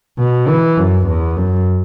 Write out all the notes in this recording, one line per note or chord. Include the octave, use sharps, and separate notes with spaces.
B2
E3
F#2
E2
F#2